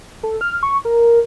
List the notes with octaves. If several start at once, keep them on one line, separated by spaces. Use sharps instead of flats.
A4
F6
C#6
A#4